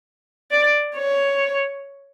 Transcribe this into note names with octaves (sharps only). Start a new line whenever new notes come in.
D5
C#5